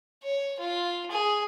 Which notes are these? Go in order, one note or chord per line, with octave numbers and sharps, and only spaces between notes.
C#5
F4
G#4